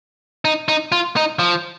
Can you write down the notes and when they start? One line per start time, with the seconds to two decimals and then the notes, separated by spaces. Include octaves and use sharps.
0.45 D#4
0.68 D#4
0.92 F4
1.16 D#4
1.39 F3